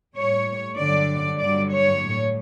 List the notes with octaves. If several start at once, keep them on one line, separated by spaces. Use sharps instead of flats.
A2 G3 C#5
G2 D3 F#3 D5
G2 D3 F#3 D5
C#5
A2 G3